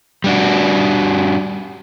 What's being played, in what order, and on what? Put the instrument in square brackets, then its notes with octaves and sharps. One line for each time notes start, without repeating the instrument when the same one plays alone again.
[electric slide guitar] G3 D4 F#4